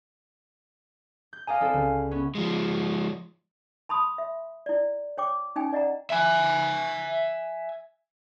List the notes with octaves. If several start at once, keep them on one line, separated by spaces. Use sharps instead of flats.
G6
D5 D#5 F5 G#5 A#5
C4 E4 A4
C#2
B3 C#4
F3 G#3
A5 B5 C6 D#6
E5
E4 D5
C#5 G5 D6
C#4 D#4 G5 G#5
D5 D#5 F#5 A#5
E5 G#5